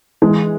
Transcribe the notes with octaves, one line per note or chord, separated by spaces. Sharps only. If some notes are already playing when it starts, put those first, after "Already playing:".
E3 G#3